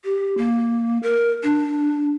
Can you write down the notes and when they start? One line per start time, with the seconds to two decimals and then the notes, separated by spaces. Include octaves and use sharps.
0.04 G4
0.38 A#3
1.03 A#4
1.43 D4